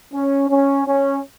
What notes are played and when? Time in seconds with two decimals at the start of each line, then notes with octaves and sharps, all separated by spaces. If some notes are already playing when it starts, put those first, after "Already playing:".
0.14 C#4
0.50 C#4
0.87 C#4